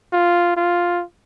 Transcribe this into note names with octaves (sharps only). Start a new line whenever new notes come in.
F4
F4